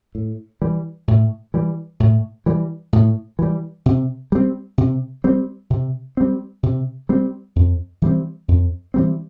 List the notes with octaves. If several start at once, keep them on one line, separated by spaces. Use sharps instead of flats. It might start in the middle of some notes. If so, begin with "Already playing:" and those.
A2
E3 G3
A2
E3 G3
A2
E3 G3
A2
E3 G3
C3
G3 C4
C3
G3 C4
C3
G3 C4
C3
G3 C4
F2
E3 G3 C4
F2
E3 G3 C4